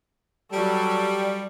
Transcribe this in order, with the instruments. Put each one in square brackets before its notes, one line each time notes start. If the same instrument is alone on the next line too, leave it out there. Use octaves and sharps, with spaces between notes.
[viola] F#3 A4 [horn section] G3